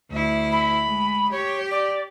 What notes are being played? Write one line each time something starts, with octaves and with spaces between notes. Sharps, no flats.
D2 E4
B5
G#3
G4 C#5
D5